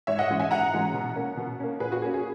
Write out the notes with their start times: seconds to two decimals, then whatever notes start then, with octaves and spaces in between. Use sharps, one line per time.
0.07 G#2 C#5 E5
0.19 D#5 F#5
0.30 E3 G#3 C#4
0.40 E5 G#5
0.51 G#2 F#5 A#5
0.73 E3 G#3 C#4
0.94 B2
1.15 A#3 C#4
1.37 B2
1.60 A#3 C#4
1.80 A#2 G#4 B4
1.92 F#4
2.02 A#3 C#4 G#4
2.14 G#4